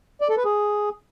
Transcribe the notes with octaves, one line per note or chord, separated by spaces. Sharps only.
D5
A4
B4
G#4